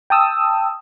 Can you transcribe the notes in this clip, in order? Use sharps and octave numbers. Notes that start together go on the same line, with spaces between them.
G5 A5 D#6 E6